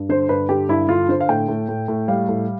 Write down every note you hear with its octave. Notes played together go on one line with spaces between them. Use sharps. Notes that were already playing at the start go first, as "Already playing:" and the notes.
Already playing: G2
D3 C5
G2 B4
D3 G4
G2 E4
D3 F4
D3 C5
F5
A2 G5
A2
A2
A2
G3 F5
A2